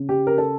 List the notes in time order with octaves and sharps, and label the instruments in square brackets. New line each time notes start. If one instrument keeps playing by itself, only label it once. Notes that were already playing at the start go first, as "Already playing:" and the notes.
Already playing: [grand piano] C#3
G4
A#4
A4